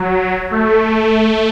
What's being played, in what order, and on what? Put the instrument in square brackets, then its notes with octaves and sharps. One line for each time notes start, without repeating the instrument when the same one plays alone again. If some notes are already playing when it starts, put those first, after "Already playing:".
Already playing: [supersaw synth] F#3
A3